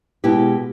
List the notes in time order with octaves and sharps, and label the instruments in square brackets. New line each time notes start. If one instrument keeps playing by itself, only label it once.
[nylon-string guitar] B2 G#3 B3 E4 G4